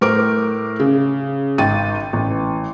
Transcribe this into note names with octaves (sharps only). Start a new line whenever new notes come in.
A2 A#4 C5 D6 D7
C#3
G#1 G5 A6 D#7
A1